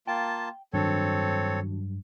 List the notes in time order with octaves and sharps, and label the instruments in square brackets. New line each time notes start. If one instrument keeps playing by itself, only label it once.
[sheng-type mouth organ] A#3 F4 A5 [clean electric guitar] G5
[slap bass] G2 F#3 [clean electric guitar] D#3 D4 F#4 [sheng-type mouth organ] C4 A4 C#5